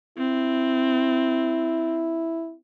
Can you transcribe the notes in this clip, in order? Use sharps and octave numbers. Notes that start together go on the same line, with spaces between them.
C4 E4